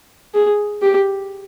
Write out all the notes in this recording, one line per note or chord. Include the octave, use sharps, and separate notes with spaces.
G#4
G4